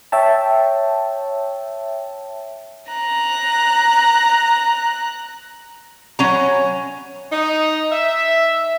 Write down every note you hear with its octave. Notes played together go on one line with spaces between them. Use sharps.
C#5 E5 G5 A5
A#5 F#6
F#3 C#4 A#5
D#4
E5